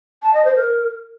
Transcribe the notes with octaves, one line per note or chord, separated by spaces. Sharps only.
A5
D#5
C5
A#4